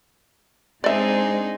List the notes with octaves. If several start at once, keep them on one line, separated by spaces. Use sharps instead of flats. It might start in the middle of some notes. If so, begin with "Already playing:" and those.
G#3 C4 D4 D#4 G#4 D5 E5